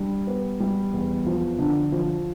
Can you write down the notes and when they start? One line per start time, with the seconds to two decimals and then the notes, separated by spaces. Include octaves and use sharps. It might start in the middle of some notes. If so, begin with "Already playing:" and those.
Already playing: G3 D4
0.27 B3
0.60 G3
0.93 E2
1.26 F3
1.59 D3
1.92 F3